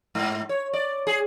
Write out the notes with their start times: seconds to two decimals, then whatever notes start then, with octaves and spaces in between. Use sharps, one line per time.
0.15 G#2
0.49 C#5
0.73 D5
1.07 G#4